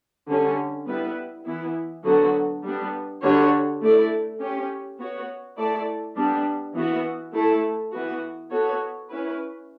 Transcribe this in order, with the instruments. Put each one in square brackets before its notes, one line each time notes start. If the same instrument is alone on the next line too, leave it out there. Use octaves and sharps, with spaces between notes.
[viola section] D3 G3 C#4
G3 B3 E4 B4
E3 B3 E4
D3 F#3 B3 F#4 A4
G3 B3 D4
D3 G3 D4 F#4 C#5
A3 E4 A4 D5
C#4 G4 C#5
B3 F#4 C#5
A3 E4 A4 D5
G3 B3 D4
E3 B3 F#4
A3 E4 A4
E3 B3 F#4
B3 F#4 A4 C#5
C#4 E4 B4